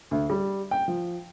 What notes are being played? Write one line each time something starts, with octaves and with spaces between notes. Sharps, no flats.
D2
G3
G5
F3